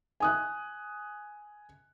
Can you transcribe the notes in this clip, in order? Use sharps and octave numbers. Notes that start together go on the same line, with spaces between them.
G#5 D#6 F#6